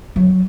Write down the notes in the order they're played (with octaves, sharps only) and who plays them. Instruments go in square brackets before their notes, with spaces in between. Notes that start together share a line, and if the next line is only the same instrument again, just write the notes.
[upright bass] F#3